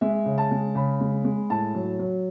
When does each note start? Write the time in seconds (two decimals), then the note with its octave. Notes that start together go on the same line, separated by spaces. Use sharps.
0.01 G#3 E5
0.26 C#3
0.38 A5
0.51 G#3
0.75 C#3 B5
1.01 G#3
1.25 G#3
1.50 A2 A5
1.75 F#3
1.99 F#3